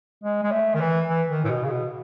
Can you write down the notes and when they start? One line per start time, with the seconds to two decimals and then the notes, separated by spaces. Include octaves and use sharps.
0.24 G#3
0.43 G#3
0.51 A3
0.74 D#3
0.81 E3
1.08 E3
1.29 D#3
1.44 A2
1.50 B2
1.64 C#3
1.71 B2